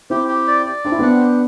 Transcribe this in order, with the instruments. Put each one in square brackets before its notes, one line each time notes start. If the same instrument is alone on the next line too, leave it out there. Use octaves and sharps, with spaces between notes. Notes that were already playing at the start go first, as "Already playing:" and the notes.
[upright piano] C4 E4 [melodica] G4
[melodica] G4
D5
D5
[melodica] C4 [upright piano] D4
[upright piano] E4
[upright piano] B3 D4 [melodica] F#5
[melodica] G4